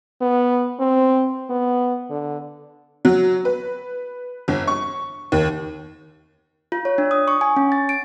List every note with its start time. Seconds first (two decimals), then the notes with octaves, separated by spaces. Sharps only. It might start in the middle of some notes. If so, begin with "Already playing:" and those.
0.22 B3
0.80 C4
1.50 B3
2.10 D3
3.05 F#3
3.45 B4
4.48 G1
4.67 C#6
5.32 D#2
6.72 F4
6.85 C#5
6.98 D4
7.11 D#6
7.28 C#6
7.41 G#5
7.57 C#4
7.72 A6
7.89 D7